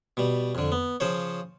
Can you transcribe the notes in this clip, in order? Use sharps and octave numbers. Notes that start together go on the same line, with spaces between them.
B2 G3
F2 D3
B3
C#3 F3 C5 C#5